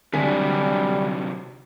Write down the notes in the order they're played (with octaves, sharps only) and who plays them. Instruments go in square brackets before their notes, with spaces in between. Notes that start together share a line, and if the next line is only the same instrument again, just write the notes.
[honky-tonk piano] D2 G#5 B6 [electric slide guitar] C3 F#3 D4 [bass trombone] G3